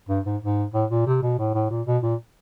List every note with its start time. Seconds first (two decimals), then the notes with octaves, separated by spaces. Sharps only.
0.09 G2
0.25 G#2
0.42 G#2
0.74 A2
0.90 A#2
1.06 C3
1.22 B2
1.38 A2
1.55 A2
1.70 A#2
1.87 B2
2.03 A#2